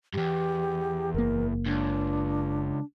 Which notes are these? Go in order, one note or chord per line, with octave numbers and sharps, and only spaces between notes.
E2 G2 G4
F#1 A#3 A#4
C#2 D4